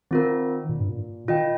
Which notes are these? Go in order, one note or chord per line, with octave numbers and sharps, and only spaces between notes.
D#3 C4 F4 A#4
A#2
G2
A#2
D#3 F4 D#5 G5